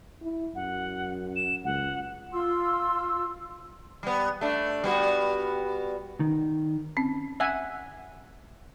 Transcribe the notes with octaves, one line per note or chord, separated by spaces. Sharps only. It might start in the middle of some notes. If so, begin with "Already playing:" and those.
E4
F#2 F#5
E7
C#2 F#5
F4 C6 E6
G3 B3
A3 D4
G3 B3 F#4
D#3
C4 C#4
E5 F#5 G#5